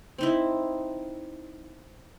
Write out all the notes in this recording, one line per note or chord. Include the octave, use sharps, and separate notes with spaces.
C4 D#4 E4